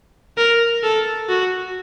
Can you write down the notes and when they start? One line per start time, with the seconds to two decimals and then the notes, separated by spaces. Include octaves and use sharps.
0.38 A#4
0.83 A4
1.29 F#4